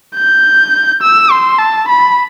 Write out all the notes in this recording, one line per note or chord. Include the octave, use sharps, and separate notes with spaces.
G6
E6
C6
A5
B5